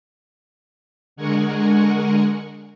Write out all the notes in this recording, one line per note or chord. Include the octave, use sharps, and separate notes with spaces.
D3 G#3 A#4 F#5 G#5 C#6